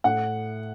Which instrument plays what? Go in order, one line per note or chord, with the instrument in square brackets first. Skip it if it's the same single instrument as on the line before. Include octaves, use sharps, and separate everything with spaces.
[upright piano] A2 F#5